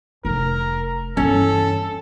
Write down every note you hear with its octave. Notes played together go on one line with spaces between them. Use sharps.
F1 A#4
G2 E3 C#4 A4